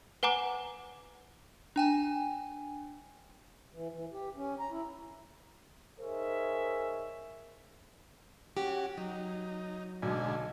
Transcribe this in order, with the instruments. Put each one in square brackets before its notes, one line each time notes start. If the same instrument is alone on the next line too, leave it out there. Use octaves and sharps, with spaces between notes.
[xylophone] B4 F#5 G#5 A#5 D6
[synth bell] D4 G5 G#5
[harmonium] E3
E3
G4
C#4
A#5
E4
[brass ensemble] D#4 G#4 A#4 C5 C#5 E5
[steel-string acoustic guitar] C#4 G4 [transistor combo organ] F#4
[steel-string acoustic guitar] F#3 [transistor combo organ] D#4
[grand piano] B1 [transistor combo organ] G#2 D3 G#5